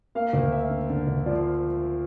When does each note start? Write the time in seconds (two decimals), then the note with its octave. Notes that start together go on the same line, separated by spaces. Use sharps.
0.15 A#3 F5
0.33 D2
0.52 A#3 E5
0.70 D3
0.90 D3
1.07 D2
1.26 F3 D5